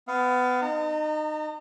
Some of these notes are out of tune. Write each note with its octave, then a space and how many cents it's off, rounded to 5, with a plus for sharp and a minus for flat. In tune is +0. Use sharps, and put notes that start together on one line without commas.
B3 +25 F5 +0
D#4 -25 A#5 -45